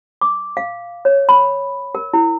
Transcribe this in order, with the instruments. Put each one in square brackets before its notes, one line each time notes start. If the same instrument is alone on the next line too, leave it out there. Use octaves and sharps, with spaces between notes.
[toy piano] D6
F5
C#5
B5
A#4
E4